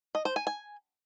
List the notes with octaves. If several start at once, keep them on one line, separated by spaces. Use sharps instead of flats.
D#5
C5
G#5
G#5